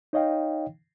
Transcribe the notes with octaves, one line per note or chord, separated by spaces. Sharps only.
D#4 C#5 D#5 F5 G5